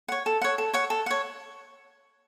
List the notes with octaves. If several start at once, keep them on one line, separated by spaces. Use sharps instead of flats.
C#5 F#5
A4
C#5 F#5
A4
C#5 F#5
A4
C#5 F#5